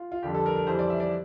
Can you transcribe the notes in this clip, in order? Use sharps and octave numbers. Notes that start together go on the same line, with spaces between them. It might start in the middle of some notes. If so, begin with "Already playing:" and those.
Already playing: F4
F4
F2 D3 G3 G4
A4
A#4
A#4
F2 E3 G3 C5
D5
E5
D5